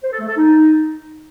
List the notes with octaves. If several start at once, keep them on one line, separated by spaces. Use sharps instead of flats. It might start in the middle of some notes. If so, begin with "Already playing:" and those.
C5
A4
A3
A4
D#4